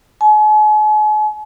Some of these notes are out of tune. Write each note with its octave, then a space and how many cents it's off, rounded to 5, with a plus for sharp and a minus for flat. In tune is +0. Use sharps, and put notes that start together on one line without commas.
G#5 +45